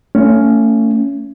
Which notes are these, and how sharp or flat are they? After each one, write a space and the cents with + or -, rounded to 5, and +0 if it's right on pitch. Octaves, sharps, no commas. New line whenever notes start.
A3 +35 C#4 +15